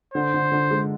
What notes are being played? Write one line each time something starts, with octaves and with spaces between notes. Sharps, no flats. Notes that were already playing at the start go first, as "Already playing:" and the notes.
D3 C5
D3
D3
G#3